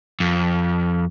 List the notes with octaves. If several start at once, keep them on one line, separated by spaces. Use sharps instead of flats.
F2